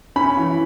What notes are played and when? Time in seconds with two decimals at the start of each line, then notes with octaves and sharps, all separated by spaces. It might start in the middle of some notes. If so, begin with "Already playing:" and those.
0.16 C#4 B5
0.38 E3